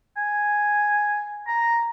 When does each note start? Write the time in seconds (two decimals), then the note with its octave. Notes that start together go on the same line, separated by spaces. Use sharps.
0.17 G#5
1.48 A#5